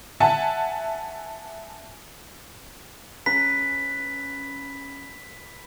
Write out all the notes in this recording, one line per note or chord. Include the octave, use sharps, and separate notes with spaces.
E5 F#5 G#5 A5
C#4 B4 B6